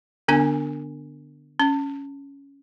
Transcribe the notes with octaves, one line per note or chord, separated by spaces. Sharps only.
D3 B3 D4 G#5
C#4